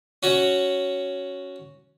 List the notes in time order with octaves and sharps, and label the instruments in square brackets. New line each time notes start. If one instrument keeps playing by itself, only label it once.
[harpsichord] C#4 F#4 C#5